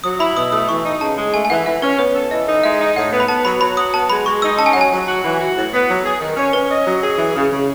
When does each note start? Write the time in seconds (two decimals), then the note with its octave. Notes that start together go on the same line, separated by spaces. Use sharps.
0.04 F#3 D#6
0.20 E4 B5
0.37 B2 D#6
0.52 A3 D#6
0.69 E3 C#6
0.84 D#4
1.01 C#3 A5
1.17 G#3
1.34 A3 G#5
1.45 G#5
1.50 E3 F#5
1.66 E3 E5
1.82 C#4 B4
1.98 B3 C#5
2.15 A4
2.31 E3 D#5
2.47 D#4
2.64 G#3 E5
2.80 D#4
2.96 A2 F#5
3.12 B3
3.20 B5
3.28 B3 A5
3.45 F#3 B5
3.61 F#3 B5
3.77 F#4 D#6
3.94 B3 A5
4.10 G#3 B5
4.26 G#3 C#6
4.42 D#4 E6
4.58 C#4 A5
4.66 G#5
4.73 F#3 F#5
4.81 G#5
4.91 F#3
5.07 F#4
5.23 E3
5.39 F#4
5.56 A2
5.73 B3
5.89 F#3
6.05 G#4
6.20 D#3
6.37 C#4
6.53 C#4 B4
6.69 D#5
6.86 F#3
7.01 G#4
7.18 E3
7.35 C#3
7.51 C#3